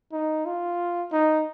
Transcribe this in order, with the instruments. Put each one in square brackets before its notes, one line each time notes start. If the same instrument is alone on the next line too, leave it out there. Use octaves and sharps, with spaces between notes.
[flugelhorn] D#4
F4
D#4